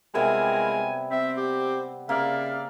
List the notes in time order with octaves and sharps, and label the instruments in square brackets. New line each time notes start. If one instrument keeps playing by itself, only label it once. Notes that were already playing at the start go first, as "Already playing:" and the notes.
[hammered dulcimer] C3 G3 B3 [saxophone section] G#3 F4 A#4 [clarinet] G#5
[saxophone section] C4 [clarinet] E5
[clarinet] G4
[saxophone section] C#3 D5 F5 [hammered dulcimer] A#3 [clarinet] E5